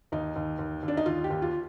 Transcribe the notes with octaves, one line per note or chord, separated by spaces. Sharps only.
D#2 D#4
D#2
D#2
D#2
D4
D#4
D#2 F4
G4
D#2
F4